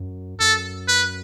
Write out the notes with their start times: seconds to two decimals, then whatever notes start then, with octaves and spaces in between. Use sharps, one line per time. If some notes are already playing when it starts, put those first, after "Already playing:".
Already playing: F#2
0.40 F#2 A4
0.88 B4